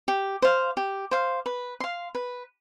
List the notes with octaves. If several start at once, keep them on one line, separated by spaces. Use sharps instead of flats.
G4
C5 F5
G4
C5 F5
B4
F5 C6
B4